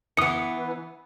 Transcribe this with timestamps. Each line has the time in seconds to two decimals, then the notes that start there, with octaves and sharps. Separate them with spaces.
0.17 E3 B3 D#6 C#7